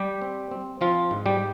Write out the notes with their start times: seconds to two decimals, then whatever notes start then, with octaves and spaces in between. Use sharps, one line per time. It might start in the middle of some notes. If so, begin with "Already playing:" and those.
Already playing: G3 G4
0.22 C4
0.51 C4
0.81 F3 C4 F4
1.11 G#2
1.26 G3 G4